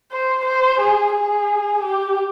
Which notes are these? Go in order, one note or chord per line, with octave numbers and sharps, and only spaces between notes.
C5
C5
G#4
G#4
G4